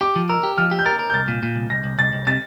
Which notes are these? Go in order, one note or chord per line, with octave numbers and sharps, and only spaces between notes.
G4 D6
F3
A#4 E6
G4
F3 F6
G4
G6
A#4 A6
A#4
G6
C2 A6
A#2
A#2
C2
C2 A#6
C2
C2 A6
C2
C3 A6